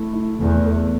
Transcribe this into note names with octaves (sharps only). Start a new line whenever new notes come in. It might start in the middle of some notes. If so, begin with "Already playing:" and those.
Already playing: A3 E4
E4
E2 A3
A4